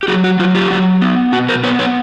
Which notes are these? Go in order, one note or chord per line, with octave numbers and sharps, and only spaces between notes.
G4
F#3 F#4 G#4
F#4
F#3 F4
F4 G4
F#3
B3
B2 F#4
A#4 C5
B3 B4 C#5
B4 C#5